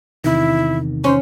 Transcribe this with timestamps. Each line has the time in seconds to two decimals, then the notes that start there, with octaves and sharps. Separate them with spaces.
0.24 E2 C3 D#3 E4
1.04 C#4 C5